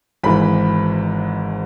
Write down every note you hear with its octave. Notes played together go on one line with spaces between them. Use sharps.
G#1 G#2 E3 B5